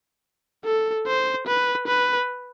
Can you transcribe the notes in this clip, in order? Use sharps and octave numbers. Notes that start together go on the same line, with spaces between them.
A4
C5
B4
B4